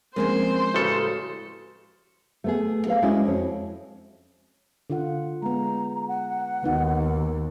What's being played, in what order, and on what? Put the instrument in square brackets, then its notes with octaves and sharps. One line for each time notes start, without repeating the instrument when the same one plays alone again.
[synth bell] F3 C4 A#4 [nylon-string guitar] G#3 A#3 C#4 [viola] C5
[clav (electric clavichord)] A1 C#3 A4 [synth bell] F#4
[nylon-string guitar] A3 B3 G#4
A4 B4 F5
G#3 C#4 D4 E4 F#4
F2 C#5
[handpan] D3 F4 F#5
[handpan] G#3 B3 [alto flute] A#5
[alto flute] F#5
[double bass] D#2 [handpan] B3 D#4 F#4